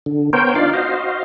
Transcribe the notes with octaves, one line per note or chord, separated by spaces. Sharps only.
D3
B3 A#4 C5 C#5 G5
D4 D#4 F4 D5 F5
F#4 C5 D#5 F5